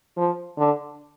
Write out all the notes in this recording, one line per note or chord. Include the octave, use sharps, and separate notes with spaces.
F3
D3